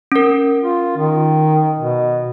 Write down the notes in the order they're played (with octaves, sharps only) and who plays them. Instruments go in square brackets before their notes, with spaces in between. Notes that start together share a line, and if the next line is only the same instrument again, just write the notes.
[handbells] C#4 A#4
[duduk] F4
D#3
B2